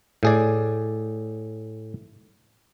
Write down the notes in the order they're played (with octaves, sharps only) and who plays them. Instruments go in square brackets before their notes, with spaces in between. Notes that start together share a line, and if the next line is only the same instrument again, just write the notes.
[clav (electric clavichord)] A2 G#4 D5